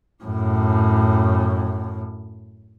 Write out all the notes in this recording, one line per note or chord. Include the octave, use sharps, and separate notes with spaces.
F#2 A2